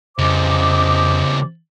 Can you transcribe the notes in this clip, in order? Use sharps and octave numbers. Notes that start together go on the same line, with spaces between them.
F2 C#3 G3 C5 D#5 D6